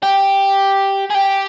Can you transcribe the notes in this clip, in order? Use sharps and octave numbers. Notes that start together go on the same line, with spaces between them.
G4
G#4
G4